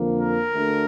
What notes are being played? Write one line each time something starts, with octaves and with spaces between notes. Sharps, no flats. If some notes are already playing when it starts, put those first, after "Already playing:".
Already playing: F2 D3 F3 A#3
A#4
D2 D3 A3